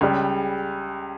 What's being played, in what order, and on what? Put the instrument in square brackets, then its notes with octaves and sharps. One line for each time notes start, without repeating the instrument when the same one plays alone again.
[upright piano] C#2 C#3 G3